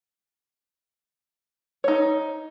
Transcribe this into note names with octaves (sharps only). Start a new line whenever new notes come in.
D#4 C#5